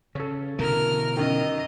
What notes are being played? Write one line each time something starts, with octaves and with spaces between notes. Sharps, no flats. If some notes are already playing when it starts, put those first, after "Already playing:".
C#3 C#4 A4
B2 D3 E3 A#4 F6
F#2 D#3 D#5